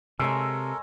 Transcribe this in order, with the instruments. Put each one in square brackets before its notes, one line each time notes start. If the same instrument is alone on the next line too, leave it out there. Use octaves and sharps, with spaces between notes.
[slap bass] C3 [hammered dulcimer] G#3 C#5 A#5 [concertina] A4 A#4 [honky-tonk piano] E6